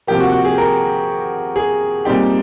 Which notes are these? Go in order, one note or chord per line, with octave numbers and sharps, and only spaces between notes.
C3 F3 A#3 G4
F#4
F#4
G#4
A#4
G#4
A#2 G3 C4 D#4 G4